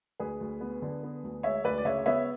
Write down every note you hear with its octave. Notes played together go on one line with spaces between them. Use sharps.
D2 G#4 B4
D2
B3
D3
B3
D2
G#3 C#5 E5
D2 B4 D5
D5
C#3 C#5 E5
B3 C#5 E5